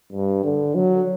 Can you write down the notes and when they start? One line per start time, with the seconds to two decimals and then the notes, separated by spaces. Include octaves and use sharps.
0.13 G2
0.44 D3
0.75 F#3